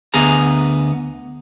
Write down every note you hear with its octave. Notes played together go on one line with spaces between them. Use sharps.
D2 B3 G#4 A#5